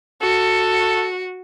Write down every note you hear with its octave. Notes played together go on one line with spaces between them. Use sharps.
F#4 A4